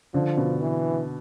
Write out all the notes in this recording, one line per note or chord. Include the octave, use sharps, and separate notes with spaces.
D3 F3
B2
E3